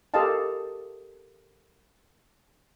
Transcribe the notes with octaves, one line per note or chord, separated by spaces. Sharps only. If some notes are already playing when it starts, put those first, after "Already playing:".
G4 A4 A#4 D#5 F5 A5